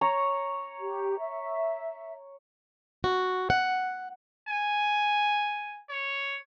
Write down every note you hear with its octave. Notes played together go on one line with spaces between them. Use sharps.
C#5 A#5
G4
E5
F#4
F#5
G#5
C#5